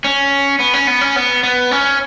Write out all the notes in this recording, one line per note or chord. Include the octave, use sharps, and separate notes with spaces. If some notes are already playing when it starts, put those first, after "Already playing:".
C#4
B3
C#4
B3
C#4
B3
B3
C#4